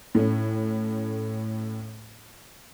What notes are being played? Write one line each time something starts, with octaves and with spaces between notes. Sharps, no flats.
A2 A3 C#4